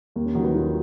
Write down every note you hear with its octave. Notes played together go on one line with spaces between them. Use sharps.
D#2 A#3
C#4
D#3 F#3 F#4
B4
D#2 F4